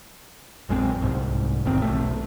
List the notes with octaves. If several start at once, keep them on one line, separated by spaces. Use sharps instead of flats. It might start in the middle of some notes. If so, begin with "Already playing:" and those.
A#1 F#2 G#3 C4
C2 G#2
E1 A1 D#3 C4
B1 A3